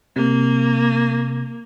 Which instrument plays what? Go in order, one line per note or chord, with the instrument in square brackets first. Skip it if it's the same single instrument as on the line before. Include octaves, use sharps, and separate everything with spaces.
[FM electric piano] C3 [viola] A#3